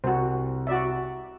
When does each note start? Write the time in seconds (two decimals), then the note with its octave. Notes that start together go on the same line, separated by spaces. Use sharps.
0.04 C2 F#4 C5 F#5
0.67 F#4 D5 E5